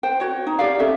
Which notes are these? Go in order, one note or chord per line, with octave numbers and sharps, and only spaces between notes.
C5 G5
F#4 C#5
D#4
G4 D5 F5
C#4 A4 E5